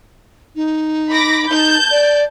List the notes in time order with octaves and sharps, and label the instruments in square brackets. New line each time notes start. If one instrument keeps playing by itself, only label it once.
[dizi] D#4
[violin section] B5 D6 A#6
[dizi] D#4 [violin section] A5 G6
[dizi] D5